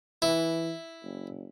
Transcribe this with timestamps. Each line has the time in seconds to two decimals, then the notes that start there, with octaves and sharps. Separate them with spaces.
0.22 E3 E4
1.03 F#1